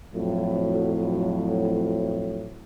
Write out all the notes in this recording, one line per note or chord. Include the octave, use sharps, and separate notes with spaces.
F2 A2 F#3